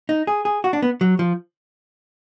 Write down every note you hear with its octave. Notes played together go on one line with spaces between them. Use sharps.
D#4
G#4
G#4
F#4
D4
B3
F#3
F3